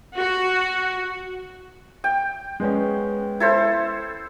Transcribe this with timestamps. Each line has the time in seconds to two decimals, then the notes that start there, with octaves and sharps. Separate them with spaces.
0.16 F#4
2.04 G5
2.60 G#3 B3 C#4
3.40 E4 A4 C5